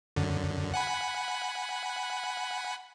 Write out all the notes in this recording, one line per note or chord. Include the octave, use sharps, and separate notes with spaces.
F#2 D3
F#5 G#5 B5